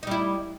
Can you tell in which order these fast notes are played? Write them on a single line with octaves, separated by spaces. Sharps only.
D#4 G3 E4